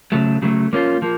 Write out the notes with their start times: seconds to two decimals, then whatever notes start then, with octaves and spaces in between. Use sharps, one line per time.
0.12 C#3 F#3 A3
0.42 C#3 F#3 A3
0.73 F3 A#3 C#4 F4
1.02 F3 A#3